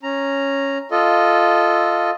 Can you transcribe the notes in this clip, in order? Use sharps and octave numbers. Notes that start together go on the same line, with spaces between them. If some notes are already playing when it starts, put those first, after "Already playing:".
C#4 A#5
F4 A4 D#5